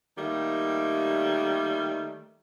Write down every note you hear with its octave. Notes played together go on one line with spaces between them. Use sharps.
D#3 G3 A3 A#3